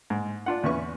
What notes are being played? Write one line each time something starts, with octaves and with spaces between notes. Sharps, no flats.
G#2
D4 F4 F#5
E2 C#4 B4 C#6